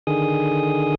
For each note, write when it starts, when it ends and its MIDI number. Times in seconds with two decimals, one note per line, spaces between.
0.07 0.95 50
0.07 0.95 51
0.07 0.95 68
0.07 0.95 87